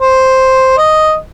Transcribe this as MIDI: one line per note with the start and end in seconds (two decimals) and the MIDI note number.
0.01 0.73 72
0.78 1.15 75